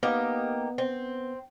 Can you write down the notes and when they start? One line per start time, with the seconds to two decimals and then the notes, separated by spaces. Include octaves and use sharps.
0.03 A#3 B3 D#4 G4
0.78 C4